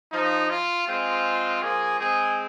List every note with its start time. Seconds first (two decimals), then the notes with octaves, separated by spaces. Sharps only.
0.12 F3 D#4
0.49 F4
0.87 G#3 C4 F4
1.62 F3 A#3 G#4
1.99 G#3 C4 G#4